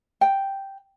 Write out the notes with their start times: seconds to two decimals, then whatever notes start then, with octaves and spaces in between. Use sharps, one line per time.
0.21 G5